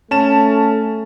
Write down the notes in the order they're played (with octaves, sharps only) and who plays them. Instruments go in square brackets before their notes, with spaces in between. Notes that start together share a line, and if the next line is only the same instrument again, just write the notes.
[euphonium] A3 [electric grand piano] C#4 A5 E7